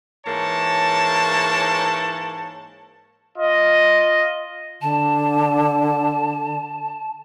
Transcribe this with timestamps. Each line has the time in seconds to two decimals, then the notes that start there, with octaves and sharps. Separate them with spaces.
0.26 G#2 E3 A#3 C#5 A5
3.37 F4 D#5
4.82 D3 A5